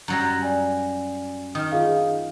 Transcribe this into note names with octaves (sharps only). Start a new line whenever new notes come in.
F#2 F#3 G3 A#5 A#6
D5 G#5
D#3 D#6 F6
F4 G#4 F5